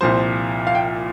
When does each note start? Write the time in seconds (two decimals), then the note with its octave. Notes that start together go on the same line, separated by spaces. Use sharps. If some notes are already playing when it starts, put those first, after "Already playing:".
0.01 C2 A#2 F3 C5
0.67 F5
0.75 G5